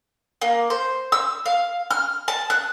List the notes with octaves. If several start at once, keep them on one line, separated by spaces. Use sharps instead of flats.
A#3
C5
E6
F5
F6
A5
F#6